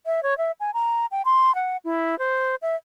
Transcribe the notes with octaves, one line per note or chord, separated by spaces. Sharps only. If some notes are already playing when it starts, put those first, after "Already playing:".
E5
C#5
E5
G#5
A#5
G5
C6
F#5
E4
C5
E5